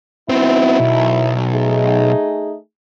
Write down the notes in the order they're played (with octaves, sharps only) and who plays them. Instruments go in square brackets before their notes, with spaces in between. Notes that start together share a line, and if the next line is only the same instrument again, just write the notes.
[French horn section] D#3 F#3 E4 [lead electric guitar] B3 C4
[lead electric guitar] B1
[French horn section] A3 D#4 G#4